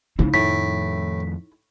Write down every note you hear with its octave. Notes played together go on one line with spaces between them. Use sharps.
C#3 C4 D#4 E4
F2 A2 D#3 A3 B6